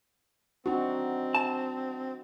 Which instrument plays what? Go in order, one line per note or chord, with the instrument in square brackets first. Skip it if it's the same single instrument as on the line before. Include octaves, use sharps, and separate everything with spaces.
[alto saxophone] C4 [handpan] D4 D#4 F#4
[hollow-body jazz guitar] A5